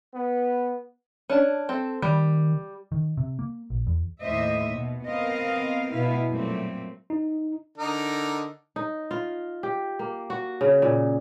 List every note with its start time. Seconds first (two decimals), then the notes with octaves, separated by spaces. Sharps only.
0.13 B3
1.30 C#4 D4 A5
1.69 C4 A4
2.02 D#3 G3
2.92 D#3
3.17 C3
3.39 A#3
3.70 A#1
3.87 E2
4.21 D#2 A2 C5 D#5 E5
4.75 B2
5.04 B3 C4 A#4 D#5 F5
5.91 B2 B3 E4 F5
6.28 F#2 A#2 G3 A3 A#3 C4
7.10 D#4
7.78 D3 D#4 A#4
8.76 D#4
9.11 F4
9.63 G4
9.99 A#3
10.30 F#4
10.61 C#3
10.82 A#2